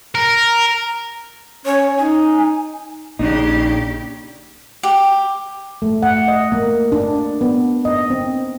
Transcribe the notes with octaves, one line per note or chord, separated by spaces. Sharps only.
A#4
C#4 C#5
D#4 G#5
A#1 C#3 A#3 D4 D#4 G4
G4
A3
F#5
D#5
A#3
D4
B3
D#5
C4